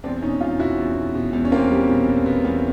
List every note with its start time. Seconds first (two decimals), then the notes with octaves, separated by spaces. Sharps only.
0.04 E2 C4 D4
0.22 B2 C#4 D#4
0.41 E2 D#4 F4
0.59 B2 E4 F#4
0.78 E2
0.96 B2
1.15 B2
1.33 E2
1.45 C#4
1.52 E2 A#3 C4
1.70 G3
1.89 B2
2.08 B2
2.26 B2 B3
2.45 E2